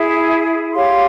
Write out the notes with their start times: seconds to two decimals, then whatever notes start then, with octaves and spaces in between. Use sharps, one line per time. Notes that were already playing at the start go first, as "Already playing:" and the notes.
Already playing: E4 G#4 E5
0.73 G4 C#5 F5 C6